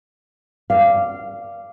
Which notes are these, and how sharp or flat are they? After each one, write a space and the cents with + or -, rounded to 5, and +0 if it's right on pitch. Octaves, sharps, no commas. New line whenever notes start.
D5 +0 F5 -20